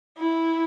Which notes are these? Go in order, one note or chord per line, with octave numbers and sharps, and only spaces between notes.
E4